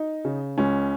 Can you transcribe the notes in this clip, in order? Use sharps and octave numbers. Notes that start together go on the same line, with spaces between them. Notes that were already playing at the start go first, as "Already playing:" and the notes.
Already playing: D#4
C#3
C#2 C#4